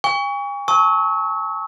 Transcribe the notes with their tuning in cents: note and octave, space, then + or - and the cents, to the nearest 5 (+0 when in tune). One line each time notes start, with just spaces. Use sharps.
G#5 -45 C#6 +25
A5 +0 C#6 +0 E6 -40